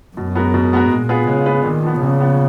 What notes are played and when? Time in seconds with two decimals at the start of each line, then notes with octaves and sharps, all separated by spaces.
0.16 F#2 B2
0.36 G#3 B3 F#4 A#4
0.54 B2
0.72 G#3 B3 F#4 A#4
0.90 A#2 G#3
1.09 B3 F4 G#4 B4
1.27 C#3 G#3
1.46 B3 F4 G#4 B4
1.64 A#2 D#3
1.83 F3 B3
2.01 A#2 C#3
2.20 F3 B3